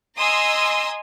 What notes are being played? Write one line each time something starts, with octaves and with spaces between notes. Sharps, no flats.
D#5 G#5 A#5 C6 D#6 E6